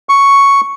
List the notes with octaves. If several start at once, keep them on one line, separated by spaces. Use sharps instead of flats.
C#6